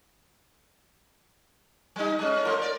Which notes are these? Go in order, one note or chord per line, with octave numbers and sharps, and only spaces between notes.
G3 D#4
G#3 C#4
A3 F4 A#4
A#4 D5